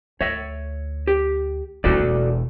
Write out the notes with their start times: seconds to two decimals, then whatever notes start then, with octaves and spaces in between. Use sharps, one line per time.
0.21 D2 C#5 E5
1.07 G4
1.84 D#1 E4 F#4 A4 D5
1.99 E1